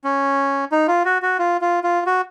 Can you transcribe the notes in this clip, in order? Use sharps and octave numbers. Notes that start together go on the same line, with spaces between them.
C#4
D#4
F4
F#4
F#4
F4
F4
F4
F#4